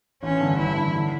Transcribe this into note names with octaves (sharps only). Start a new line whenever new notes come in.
A1 C#4
G2 D3
A1 E4
G2 D3
D3